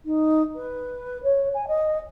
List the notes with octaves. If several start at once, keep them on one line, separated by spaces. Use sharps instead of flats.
D#4
B4
C#5
G#5
D#5